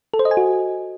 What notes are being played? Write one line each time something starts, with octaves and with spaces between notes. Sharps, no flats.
A4
C5
D#5
G#5
F#4